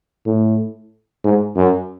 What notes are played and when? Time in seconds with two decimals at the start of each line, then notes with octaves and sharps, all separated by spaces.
0.26 A2
1.24 G#2
1.56 F#2